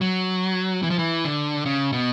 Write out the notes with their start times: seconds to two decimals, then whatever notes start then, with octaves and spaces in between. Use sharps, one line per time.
0.01 F#3
0.83 E3
0.90 F3
0.99 E3
1.24 D3
1.66 C#3
1.93 B2